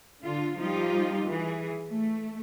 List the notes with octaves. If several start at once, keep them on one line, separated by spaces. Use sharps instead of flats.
D3 F4
F3 G3 D#4 F4 G4
E3 G#4
A3